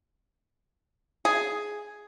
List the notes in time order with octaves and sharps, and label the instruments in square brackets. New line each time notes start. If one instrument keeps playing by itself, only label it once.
[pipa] G#4